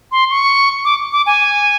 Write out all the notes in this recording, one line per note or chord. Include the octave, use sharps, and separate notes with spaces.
C6
C#6
D6
D6
G#5